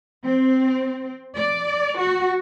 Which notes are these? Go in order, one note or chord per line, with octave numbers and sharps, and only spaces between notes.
C4
D5
F#4